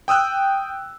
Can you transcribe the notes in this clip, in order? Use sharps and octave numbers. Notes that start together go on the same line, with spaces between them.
G5 D#6 E6 F#6